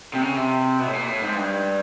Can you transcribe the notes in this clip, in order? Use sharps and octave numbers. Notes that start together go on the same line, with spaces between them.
C3
C#3
C3
B2
A2
A#2
A2
G#2
G2